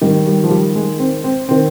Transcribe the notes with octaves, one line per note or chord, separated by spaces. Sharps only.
G#2 D#3 G3
G3
F3
G3
G#3
C4
C4
D#3 C4